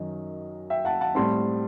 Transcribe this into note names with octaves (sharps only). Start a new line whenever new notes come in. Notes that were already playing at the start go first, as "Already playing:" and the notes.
Already playing: F#2 D#3 F#3 D#5
E5 G5
F#5 A5
F#5 A5
A2 G3 C4 A5 C6